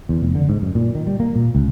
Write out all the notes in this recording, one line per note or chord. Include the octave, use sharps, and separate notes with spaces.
E2
F1
D3
G#2
F#2
A#2
D#3
G3
A#3
A#2
C#2